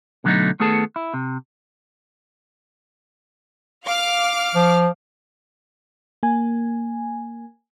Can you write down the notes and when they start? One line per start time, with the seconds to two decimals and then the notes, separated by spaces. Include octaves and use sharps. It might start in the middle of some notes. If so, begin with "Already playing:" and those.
0.24 B2 D3 F#3 G#3 A3 D#4
0.60 D#3 A3 B3 G#4 A4 A5
0.96 E4
1.14 C3
3.84 F5 D6 F6
4.55 F3
6.23 A#3 G#5